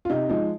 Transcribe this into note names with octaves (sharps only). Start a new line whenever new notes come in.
F4
C3 D#4
F3 G#3 D#4